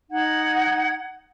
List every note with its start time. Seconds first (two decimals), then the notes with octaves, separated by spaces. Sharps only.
0.11 D#4 F#5 G#6